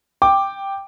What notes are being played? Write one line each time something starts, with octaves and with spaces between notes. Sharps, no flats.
G5 D6